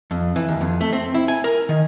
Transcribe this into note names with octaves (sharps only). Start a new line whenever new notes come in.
F2
E3
D#2
F2
A3
C4
E4
G#5
A#4
D#3